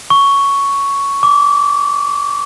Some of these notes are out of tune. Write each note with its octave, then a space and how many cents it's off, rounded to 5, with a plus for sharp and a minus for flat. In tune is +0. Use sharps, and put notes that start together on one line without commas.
C#6 +5
D6 -25